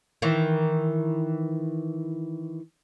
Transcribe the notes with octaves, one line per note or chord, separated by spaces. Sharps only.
D#3 E3